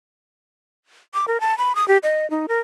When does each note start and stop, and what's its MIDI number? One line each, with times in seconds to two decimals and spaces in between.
1.14 1.25 86
1.28 1.40 70
1.40 1.57 81
1.58 1.75 83
1.75 1.86 87
1.88 1.98 67
2.03 2.29 75
2.30 2.46 63
2.48 2.60 70